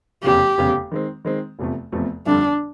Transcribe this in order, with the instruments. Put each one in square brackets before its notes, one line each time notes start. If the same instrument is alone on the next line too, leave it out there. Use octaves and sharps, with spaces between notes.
[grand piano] F1 E2 C#3 [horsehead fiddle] G4
[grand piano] F1 E2 C#3
D#3 G#3 C4
D#3 G#3 C4
F1 E2 C3 F3 A3
F1 E2 C3 F3 A3
[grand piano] G1 F2 D3 G3 [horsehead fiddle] D4